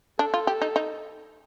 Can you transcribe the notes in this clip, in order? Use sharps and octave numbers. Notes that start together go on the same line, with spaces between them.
D4 A4
F4
G4
D#4
D#4